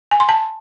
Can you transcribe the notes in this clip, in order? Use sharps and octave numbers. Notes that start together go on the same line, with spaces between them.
G#5
C6
A5